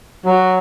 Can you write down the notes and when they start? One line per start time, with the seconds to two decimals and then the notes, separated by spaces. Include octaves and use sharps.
0.25 F#3